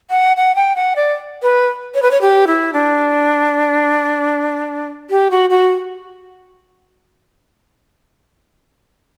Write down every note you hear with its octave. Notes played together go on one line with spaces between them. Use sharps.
F#5
F#5
G5
F#5
D5
B4
C#5
B4
C#5
G4
E4
D4
G4
F#4
F#4